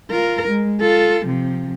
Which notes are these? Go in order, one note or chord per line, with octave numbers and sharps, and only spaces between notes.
F4 A#4
G#3
F4 A4
C3 F3